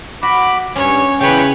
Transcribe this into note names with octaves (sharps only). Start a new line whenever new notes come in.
F#4 B5 D6
G2 C#4 C#5
E2 C#3 B4 C#5 G5